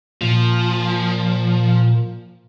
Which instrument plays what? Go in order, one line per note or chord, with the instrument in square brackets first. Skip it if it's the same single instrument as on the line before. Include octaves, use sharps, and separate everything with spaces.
[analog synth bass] A#2 [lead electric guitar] F3